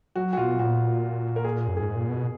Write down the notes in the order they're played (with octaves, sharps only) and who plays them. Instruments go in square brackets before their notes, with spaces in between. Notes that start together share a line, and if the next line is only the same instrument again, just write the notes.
[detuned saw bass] F#3 [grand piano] F#4
[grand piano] F#4
[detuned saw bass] B2 [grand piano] F4
[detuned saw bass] A#2 [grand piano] F#4
[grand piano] A#4
G#4
[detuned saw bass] F#2
[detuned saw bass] G#2 [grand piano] G#4
[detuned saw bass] A#2
B2